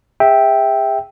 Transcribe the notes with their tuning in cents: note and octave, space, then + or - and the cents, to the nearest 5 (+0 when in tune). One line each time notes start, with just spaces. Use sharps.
G#4 -35 E5 -10 G5 +0